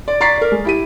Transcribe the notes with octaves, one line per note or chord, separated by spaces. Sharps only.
D5
D5 A#5 C#6 A6 B6 C7
A#4 D5
G#3
E4 G4 D#7